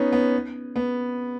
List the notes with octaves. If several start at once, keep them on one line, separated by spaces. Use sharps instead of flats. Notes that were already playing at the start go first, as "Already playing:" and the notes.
Already playing: B3 C#4 D#4
B3
B3